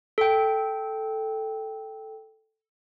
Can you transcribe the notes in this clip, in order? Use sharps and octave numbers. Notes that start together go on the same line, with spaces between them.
A4 G5